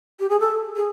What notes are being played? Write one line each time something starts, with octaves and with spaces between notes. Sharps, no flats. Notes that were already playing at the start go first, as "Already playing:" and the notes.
G4
G#4
A4
G#4